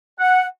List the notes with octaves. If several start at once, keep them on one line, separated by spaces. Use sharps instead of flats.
F#5